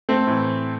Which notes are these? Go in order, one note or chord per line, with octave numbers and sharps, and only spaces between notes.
A3 C4
A2 E3